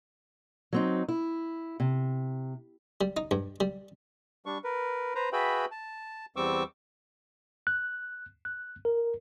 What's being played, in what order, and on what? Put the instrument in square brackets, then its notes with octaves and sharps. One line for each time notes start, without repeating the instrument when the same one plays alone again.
[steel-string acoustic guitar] F#3 C4 D#4
E4
C3
[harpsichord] G3
D#4
G2
G3
[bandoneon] G3 D4 C#6
A#4 B4
B4 C5 A#5
F#4 G#4 B4 E5 G5 B5
A5
E2 G3 C4 C#6 D6 E6
[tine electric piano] F#6
F#6
A#4